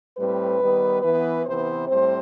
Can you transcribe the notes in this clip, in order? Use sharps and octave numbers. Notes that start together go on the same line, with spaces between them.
A2 G3 C4 B4
D#3 G3 B3
E3 B3 B4
C3 E3 B3 C5
A2 G3 C4 C5